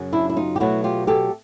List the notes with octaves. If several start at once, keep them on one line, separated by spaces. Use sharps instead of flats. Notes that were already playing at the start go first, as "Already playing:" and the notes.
Already playing: F#2 C#3 F#3
D4 E4
E4
D#4 F4
G4
B2 F#3 A3 E4 F#4
F4 G4
G4 A4